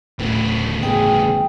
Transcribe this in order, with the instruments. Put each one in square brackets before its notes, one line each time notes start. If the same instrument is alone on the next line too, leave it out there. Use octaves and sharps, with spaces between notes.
[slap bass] D1 D2 [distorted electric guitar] A2 C#3
[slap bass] G1 D2 E3 [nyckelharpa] G#4 [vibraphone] G5